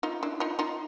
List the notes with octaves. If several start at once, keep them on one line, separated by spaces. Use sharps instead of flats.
D#4 F4
D4 E4
D#4 F4
D#4 F4